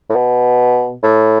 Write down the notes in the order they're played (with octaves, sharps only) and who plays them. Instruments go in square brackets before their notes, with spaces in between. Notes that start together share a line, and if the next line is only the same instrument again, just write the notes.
[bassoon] A2
B2
A2